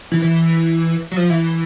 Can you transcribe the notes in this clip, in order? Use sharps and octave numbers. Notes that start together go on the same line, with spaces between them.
E3
E3
F#3
F3
E3